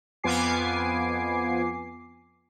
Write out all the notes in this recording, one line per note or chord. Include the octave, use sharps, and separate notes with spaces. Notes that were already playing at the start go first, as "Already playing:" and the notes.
F2 B3 F4 G#5 D6 C7